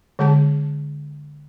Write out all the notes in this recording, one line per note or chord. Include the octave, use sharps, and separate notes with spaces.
D3 G#3 G#4 A5